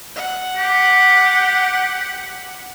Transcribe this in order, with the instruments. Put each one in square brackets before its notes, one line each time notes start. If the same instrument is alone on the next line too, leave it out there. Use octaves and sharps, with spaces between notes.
[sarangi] F#5
[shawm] G4